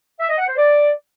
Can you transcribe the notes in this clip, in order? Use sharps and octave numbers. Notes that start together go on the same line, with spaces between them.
E5
D#5
F#5
C5
D5